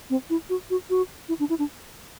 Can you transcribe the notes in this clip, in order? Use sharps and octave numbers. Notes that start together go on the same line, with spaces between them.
C4
E4
F#4
F#4
F#4
E4
D4
E4
D4